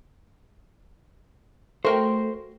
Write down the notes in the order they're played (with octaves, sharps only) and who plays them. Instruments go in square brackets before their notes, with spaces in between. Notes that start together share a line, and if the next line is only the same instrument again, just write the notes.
[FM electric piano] A3 [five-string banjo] F#4 A#4 G5 [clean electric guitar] C5